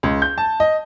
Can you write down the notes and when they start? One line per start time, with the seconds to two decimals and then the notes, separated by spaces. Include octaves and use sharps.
0.03 C#2
0.22 G6
0.38 A5
0.60 D#5